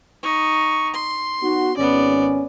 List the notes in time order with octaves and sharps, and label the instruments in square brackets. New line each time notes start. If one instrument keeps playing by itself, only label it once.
[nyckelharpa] D#4 C#6
C6
[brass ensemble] B3 D#4 F#4
[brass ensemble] G#1 C#4 [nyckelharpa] B3 D5